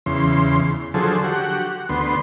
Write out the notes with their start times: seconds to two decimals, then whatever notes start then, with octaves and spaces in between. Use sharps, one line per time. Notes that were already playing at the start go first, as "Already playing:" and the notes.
0.06 E2 C#3 C6
0.94 D3 F3 F#3 G#4 A4 C5
1.24 F#4 G4 F#5
1.89 D2 B3 C6